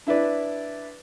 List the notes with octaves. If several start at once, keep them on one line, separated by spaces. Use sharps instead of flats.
D4 E4 B4 D5